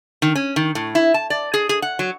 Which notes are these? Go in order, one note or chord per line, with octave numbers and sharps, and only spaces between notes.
D#3
C#4
D#3
A2
E4
A5
D5
G#4
G#4
F#5
F#3